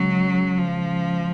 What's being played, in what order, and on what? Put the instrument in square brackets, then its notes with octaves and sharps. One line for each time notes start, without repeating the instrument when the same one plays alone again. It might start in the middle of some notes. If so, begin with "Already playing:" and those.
Already playing: [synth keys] C#3 G#3 C#4 [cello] F#3
[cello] F3